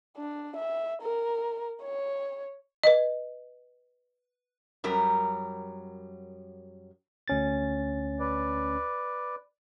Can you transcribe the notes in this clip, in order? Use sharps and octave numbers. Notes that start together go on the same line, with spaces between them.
D4
E5
A#4
C#5
B4 D#5
F#2 F#3 G3 A#4
D2 C#4 A6
B4 D5